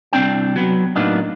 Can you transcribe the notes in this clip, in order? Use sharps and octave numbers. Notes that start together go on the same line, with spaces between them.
C2 E3 C4 D4 G5
F#3 B3
A2 F#3 A#3 B3 D4 D#4